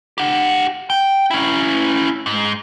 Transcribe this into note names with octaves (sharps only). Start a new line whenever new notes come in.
G4 F#5
G5
C#4 E4
G#2